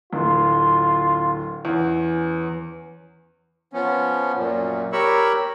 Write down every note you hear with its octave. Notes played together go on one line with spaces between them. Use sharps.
D1 F4
E2 C#4
F3 B3 C#4
F#2 A#2
G4 A#4 C#5 B5 C#6 E6